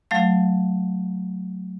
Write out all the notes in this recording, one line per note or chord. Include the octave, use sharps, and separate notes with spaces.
F#3 A3 F5